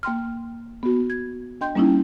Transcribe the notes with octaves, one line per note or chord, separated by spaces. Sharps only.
A#3 G5 C6 F6
B3 F#4
G#6
D4 D#5 G5 C6 G6
G3 A#3 C#4 D#4 E4